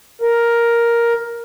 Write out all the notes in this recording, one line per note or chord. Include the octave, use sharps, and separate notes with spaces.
A#4